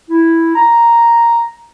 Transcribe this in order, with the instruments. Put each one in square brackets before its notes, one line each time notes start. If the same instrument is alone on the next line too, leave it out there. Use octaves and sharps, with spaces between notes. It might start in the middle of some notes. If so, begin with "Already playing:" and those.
[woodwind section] E4
A#5